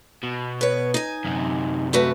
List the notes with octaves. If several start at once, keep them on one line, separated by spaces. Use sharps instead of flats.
B2
B4 C#5
D#4 G#5
F#2 C3
A3 F#4 B4